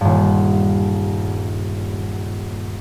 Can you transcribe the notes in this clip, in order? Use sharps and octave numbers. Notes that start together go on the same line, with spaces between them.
D#1 G2